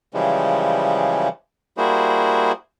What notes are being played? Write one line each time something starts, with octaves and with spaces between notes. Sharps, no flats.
C#3 E3 F3 G3 G#3
G3 A#3 E4 F#4 G#4 C5